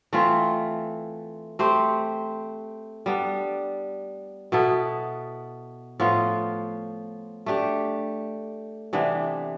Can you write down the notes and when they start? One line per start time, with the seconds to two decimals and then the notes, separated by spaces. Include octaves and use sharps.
0.13 E3 A3 C4 F4
1.59 A3 C4 G4 C5
3.06 G3 B3 D4
4.52 B2 B3 E4 A4
6.00 A2 F3 B3 F4
7.46 A3 D4 G4
8.93 C3 E3 B3 D4